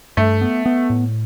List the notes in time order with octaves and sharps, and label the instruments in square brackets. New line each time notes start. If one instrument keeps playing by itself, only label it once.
[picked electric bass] G2 [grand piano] A3
[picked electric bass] B3
B3
A2